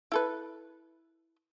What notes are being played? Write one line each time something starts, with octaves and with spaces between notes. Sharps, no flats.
E4 A4 B4